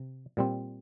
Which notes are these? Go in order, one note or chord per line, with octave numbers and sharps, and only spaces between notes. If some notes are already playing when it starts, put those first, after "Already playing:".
Already playing: C3
A#2 G3 C4